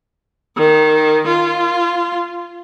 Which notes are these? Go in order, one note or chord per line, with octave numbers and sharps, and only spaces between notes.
D#3
F4